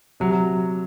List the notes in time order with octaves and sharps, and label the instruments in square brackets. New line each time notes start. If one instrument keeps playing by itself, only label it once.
[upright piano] C3 [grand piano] F#3
[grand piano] F#3